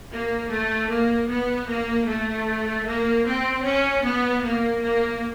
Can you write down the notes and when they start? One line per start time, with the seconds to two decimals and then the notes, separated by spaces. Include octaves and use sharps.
0.11 A#3
0.50 A3
0.89 A#3
1.29 B3
1.68 A#3
2.06 A3
2.85 A#3
3.24 C4
3.63 C#4
4.02 B3
4.42 A#3
4.81 A#3